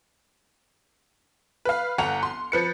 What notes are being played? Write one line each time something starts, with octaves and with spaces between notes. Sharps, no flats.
B4 F5
G1 F#5 A#5 F7
C6
F3 B4 C#7